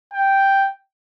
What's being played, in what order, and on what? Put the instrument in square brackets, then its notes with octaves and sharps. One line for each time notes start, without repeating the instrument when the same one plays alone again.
[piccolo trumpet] G5